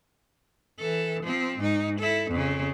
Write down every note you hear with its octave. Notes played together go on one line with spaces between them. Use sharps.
E3 A4
F3 C4
G#2 D#4
E4 A4
F2 C#3